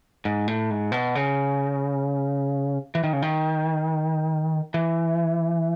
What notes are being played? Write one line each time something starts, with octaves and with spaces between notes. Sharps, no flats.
G#2
A2
G#2
B2
C#3
E3
D#3
C#3
D#3
E3